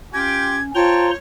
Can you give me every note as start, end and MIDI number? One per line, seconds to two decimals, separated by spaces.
0.14 0.71 61
0.14 0.57 65
0.14 0.57 67
0.14 0.57 79
0.14 0.63 92
0.75 1.13 65
0.75 1.11 72
0.75 1.17 73
0.75 1.07 79
0.75 1.07 81
0.75 1.11 82
0.75 1.11 84